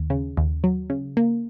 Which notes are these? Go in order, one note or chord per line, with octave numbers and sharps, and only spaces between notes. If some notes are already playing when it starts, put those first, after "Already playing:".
Already playing: D#2
C#3
D#2
F#3
C#3
A#3